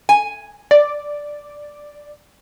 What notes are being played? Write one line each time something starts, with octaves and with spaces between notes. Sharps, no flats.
G#5
D5